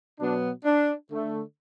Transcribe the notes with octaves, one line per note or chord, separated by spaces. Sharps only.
B2 F#3 B3 D4
D4
D3 A3